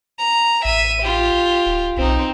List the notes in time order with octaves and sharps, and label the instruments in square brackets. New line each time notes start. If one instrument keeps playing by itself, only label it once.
[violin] A#5
[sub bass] A1 [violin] E5 D#7
[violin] F4 G4
[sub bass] D1
[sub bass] B1 [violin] C4 D#4